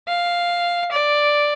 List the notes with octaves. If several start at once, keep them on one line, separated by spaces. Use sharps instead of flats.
F5
D5